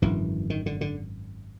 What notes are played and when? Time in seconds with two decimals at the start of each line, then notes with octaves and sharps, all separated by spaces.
0.02 G#1 F#2 D3 E3
0.50 D#3
0.66 D3
0.81 D3